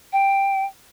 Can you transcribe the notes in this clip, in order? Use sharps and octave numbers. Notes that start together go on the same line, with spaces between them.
G5